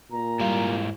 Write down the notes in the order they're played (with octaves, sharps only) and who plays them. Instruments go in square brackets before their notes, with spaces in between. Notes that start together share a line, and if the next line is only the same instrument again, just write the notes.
[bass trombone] A#2 [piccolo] A#5
[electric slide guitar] G#2 E4 F5 [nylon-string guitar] G3